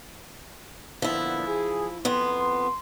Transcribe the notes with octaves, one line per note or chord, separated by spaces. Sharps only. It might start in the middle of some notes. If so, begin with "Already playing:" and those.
A#2 D3 F3 B3 E4
G#4
F2 B3 C6